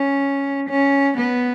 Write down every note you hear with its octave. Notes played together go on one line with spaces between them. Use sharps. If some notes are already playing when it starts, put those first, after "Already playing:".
Already playing: C#4
C#4
B3